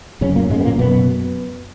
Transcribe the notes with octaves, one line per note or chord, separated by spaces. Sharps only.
F#2 C#3 C#4
A#2 A#3
G#2 C#3 G#3
B3
A#2 A#3
F#2 B2 B3